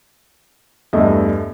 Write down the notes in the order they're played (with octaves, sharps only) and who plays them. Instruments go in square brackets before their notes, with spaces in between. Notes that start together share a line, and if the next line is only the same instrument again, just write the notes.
[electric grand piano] E2 G2 [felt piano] A3 D#5